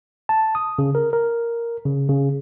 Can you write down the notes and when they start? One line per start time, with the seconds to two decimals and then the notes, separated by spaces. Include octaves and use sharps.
0.29 A5
0.55 D#6
0.79 C#3
0.95 A#4
1.13 A#4
1.85 C#3
2.09 C#3